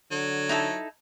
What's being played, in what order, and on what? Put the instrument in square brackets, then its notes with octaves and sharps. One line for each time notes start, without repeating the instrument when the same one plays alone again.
[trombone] D3 [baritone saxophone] F#3
[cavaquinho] D#4 E4 A4